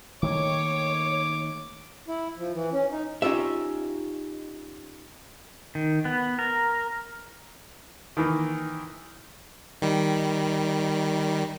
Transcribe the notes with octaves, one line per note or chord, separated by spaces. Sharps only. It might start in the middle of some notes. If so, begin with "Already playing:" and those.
D#3 A3 A#3 C#5 D6
E4
F3
E3
C#4
D#4
C#4 D#4 F4 G4 E5
D#3
B3
A#4
D#3 E3 A#3
D#3 G3